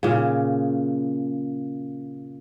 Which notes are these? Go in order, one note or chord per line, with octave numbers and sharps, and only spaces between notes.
A#2 C#3